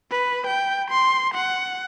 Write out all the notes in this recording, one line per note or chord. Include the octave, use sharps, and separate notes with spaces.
B4
G5
C6
F#5